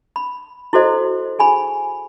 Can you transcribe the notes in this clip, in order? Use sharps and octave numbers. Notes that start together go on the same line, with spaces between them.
B5
E4 F#4 A4 C5 D#5
G#4 G#5 B5